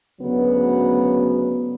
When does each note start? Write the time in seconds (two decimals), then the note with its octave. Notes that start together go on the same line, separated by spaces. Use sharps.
0.20 D2 C#3 F#3 B3